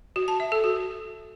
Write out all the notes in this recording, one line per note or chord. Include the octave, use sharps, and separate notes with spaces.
F#4
A5
E5
A4
F#4